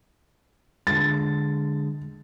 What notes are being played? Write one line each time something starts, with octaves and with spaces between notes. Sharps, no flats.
D3 G#3 A6